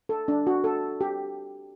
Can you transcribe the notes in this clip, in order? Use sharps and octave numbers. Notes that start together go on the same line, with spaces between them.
A4
D4
F#4
A4
G4